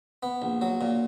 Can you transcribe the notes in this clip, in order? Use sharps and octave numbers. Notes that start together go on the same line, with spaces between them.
B3
A#1
F#3
A#2